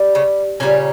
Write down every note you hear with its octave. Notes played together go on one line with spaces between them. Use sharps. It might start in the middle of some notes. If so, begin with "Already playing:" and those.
Already playing: G3
C#3 C#4
A#2 C#3 G3 C#4